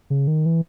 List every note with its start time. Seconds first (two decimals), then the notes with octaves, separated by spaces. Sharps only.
0.10 C#3
0.27 D#3
0.46 E3